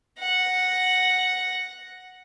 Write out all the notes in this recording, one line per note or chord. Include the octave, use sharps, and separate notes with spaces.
F#5 A#6